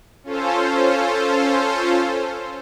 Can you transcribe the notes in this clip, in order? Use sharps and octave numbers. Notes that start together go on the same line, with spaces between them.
C#4 F4 A4 C5